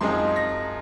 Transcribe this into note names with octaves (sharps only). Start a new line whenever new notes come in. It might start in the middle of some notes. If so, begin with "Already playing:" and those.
F#2 F3 G#3 C4 D#4 C6
A#6